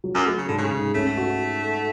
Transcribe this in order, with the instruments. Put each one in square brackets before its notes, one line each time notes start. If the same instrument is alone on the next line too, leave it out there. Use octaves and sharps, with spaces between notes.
[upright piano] F#3
[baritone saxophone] F#2
[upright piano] A3
[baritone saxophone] C#3
[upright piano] G#2 [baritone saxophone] D3
[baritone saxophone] C#3
[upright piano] G#2
[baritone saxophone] A3 [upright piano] C#4
[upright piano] F#4